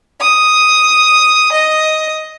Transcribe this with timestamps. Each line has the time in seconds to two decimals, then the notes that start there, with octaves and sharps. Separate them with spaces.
0.21 D#6
1.52 D#5